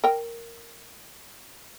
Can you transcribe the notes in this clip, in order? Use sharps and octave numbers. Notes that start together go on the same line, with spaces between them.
A#4 G5